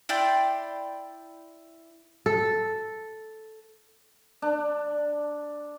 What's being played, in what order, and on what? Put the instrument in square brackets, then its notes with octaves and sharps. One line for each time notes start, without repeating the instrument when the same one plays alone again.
[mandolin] E4 D5 G5 C6
[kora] A4
[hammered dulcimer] D4